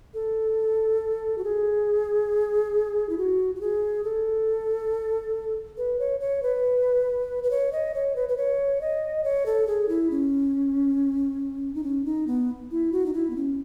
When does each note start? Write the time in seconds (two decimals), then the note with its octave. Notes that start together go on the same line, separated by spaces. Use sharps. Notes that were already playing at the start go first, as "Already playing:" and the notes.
0.14 A4
1.38 F#4
1.44 G#4
3.09 E4
3.18 F#4
3.55 F#4
3.61 G#4
4.04 A4
5.78 B4
5.99 C#5
6.20 C#5
6.43 B4
7.44 B4
7.51 C#5
7.72 D#5
7.94 C#5
8.16 B4
8.29 B4
8.37 C#5
8.81 D#5
9.24 C#5
9.46 A4
9.67 G#4
9.89 E4
10.11 C#4
11.75 D#4
11.84 C#4
12.05 D#4
12.27 B3
12.71 E4
12.92 F#4
13.06 D#4
13.14 E4
13.30 B3
13.36 C#4